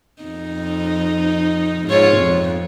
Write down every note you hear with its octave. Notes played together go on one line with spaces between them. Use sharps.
F2 D#4
G#2 F4 C#5
F2